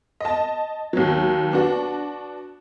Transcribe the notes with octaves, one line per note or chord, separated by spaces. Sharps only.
D#5 A5
D#2 F#3
B3 D4 F#4